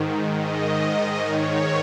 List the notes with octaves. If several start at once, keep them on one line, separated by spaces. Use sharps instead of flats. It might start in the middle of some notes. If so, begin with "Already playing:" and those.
Already playing: G#2 D#3
G#2 D#3 D#5
G#2 D#3 C#5